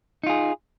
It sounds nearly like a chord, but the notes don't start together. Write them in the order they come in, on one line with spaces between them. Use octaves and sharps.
D#4 F4 G#4